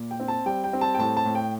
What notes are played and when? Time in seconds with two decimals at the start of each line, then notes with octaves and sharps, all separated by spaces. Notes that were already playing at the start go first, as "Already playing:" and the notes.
Already playing: A#2
0.11 G5
0.20 C4
0.28 A5
0.46 G3 G5
0.64 G5
0.73 C4
0.81 A5
0.94 G5
0.99 A2 A5
1.17 A5
1.25 A2
1.35 G5